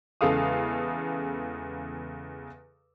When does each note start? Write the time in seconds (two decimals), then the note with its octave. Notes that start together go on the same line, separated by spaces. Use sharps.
0.21 E2 C#3 G#3 A4 F5 D#6